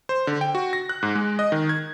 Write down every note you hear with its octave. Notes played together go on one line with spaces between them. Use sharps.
C5
D3
G5
F#4
A#6
F#6
G#2
G#3
D#5
D#3
G#6